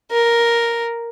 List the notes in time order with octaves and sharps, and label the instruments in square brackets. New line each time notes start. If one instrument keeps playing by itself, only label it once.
[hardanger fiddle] A#4